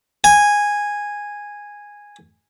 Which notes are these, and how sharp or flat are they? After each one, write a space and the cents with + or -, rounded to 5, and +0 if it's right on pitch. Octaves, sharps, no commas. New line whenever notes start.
G#5 -10